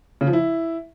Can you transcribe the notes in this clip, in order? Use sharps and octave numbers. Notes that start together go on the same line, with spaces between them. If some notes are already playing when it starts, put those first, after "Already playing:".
C#3
F3
E4